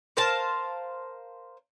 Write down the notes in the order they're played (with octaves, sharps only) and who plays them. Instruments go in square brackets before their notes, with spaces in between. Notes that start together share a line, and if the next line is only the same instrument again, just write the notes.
[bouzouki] A#4 C5 F5 A5